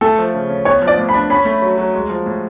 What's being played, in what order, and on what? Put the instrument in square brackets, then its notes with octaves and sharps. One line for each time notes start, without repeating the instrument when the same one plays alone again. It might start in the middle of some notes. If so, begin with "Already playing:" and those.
[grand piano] A3 [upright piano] A4
[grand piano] F3
C#3
C#4
[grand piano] B3 [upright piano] C#5
[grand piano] F3
[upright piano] D5
[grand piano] A2
[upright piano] B5
[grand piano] D4
[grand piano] C#4 [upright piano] B5
[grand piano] A3
F#3
F#3
G#3
F3
A2